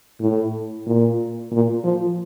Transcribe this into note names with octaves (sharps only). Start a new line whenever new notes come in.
A2
A#2
A#2
F3